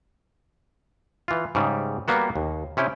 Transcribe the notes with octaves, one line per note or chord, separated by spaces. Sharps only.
E3 F4
G#2 C#3 G3
G3 A#3 B3 F#4
D#2
C3 C#4 E4 G5